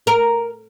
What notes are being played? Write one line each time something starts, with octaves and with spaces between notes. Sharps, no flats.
A#4